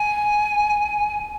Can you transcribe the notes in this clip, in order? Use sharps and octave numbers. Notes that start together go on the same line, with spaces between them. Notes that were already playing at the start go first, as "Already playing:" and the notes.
Already playing: G#5